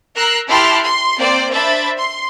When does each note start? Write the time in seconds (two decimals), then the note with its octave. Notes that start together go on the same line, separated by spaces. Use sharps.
0.15 A#4 A#5 E6 F#6 C7
0.48 E4 G4 A5 C6 F6 F#6
0.82 C6
1.18 A#3 C4 C5 D5
1.51 D4 C5 E5 B5 A6
1.97 C6